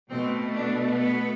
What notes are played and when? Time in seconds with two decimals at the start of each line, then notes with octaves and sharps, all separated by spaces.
0.10 B2 A3 C4
0.54 D4
0.97 B3